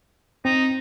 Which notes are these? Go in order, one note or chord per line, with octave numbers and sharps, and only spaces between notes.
C4 D#4